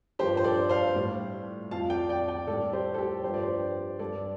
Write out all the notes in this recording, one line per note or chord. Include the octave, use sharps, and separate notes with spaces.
G2 F3 G4 C5
C5
A4 D5
C5 F5
A2 G3
F2 F3 F5 A5
D5 G5
D5 G5
D5 G5
A2 G3 A4 D5
G4 C5
A4
G4
G2 F3 C5
D5
G4 C5
G2 G3 A4 D5